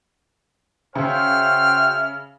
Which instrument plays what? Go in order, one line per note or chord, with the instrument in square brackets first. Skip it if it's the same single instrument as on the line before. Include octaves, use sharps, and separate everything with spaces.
[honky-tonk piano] C#3 [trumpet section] F#4 C5 G5 [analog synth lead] E5 [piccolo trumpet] F6